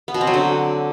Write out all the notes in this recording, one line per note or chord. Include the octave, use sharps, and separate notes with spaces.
B3
B2
C4
F#3
D3